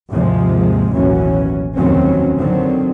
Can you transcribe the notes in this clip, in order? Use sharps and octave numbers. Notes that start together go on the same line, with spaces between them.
D#2 G#2 C3 F3 G#3
A1 D#2 B2 E3 F#3 C#4
F1 D#2 D#3 F#3 C4 C#4
D3 D#3 F#3 C4